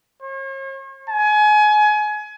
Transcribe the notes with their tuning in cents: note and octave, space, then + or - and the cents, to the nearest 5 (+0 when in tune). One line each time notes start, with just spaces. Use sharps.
C#5 -45
G#5 +30